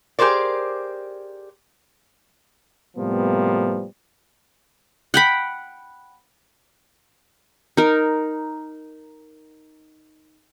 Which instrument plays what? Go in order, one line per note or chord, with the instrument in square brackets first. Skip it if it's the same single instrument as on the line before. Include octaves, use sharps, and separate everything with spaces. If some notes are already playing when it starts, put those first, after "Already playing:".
[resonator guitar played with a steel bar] G4 G#4 A#4 C5 D5
[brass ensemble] A2 C3 F3 G3 A#3 B3
[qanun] F#5 G5 B5
D#4 A#4